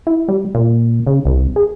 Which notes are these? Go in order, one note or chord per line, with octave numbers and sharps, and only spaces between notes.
E4
G3
A#2
C#3
C2
G#4